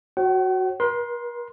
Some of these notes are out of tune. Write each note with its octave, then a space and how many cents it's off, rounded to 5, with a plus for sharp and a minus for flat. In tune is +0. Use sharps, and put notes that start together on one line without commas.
F#4 +0 C#5 -40 F#5 +45
A#4 +45 C6 +0